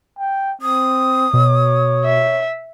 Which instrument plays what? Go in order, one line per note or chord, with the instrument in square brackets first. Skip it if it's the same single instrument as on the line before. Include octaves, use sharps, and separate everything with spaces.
[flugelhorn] G5
[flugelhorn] C4 [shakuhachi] D#6
[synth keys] B2 [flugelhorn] C#5
[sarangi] E5